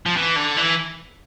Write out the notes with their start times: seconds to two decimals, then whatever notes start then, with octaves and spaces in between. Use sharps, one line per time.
0.06 F3
0.16 E3
0.36 D3
0.57 E3